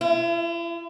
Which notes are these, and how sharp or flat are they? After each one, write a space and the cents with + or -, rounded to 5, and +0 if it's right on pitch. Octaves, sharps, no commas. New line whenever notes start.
E4 +45